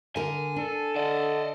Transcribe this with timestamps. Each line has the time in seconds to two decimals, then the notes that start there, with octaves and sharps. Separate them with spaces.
0.16 D3 D4 A#4 G#5
0.56 D4 A4
0.96 D3 D5 D#5